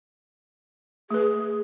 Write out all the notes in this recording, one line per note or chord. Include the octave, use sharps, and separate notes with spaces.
A3 G#4 B4